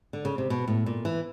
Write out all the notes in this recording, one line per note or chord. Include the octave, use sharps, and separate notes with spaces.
D3
C#3
C3
B2
A2
A#2
E3